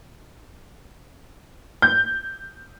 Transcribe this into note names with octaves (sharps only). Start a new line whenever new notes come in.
G6